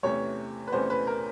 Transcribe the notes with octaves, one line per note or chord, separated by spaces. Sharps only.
E2 C3 E3 A3 C#4 C#5
B4
E2 C3 E3 A3 C#4 C5
B4
A#4